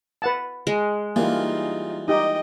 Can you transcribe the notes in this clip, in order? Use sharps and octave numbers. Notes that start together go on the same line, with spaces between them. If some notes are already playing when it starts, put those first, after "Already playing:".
B4 F#5 A5
G#3
E3 G3 A#3 D#4 F4
D#4 G4 D#5 G5